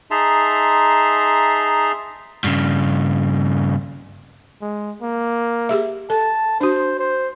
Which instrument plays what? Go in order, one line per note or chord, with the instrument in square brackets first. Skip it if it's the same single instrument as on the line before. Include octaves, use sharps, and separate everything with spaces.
[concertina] D#4 G#4 E5 A5 A#5 C6
[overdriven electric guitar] G2 C#3
[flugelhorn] G#3
A#3
[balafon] G4 G#4 E5
[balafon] A4 [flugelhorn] A5
[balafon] D4 F#4 [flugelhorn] C5
[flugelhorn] C5